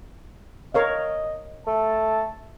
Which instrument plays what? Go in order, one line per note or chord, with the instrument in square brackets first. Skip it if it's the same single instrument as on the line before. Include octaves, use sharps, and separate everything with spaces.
[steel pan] A#4 C#5 F5 [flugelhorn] D#5
[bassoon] A3 [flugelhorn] A5